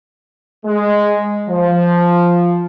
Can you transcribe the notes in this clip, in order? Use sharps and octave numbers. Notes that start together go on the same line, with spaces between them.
G#3
F3